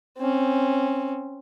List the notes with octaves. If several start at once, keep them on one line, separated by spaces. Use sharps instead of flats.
C4 C#4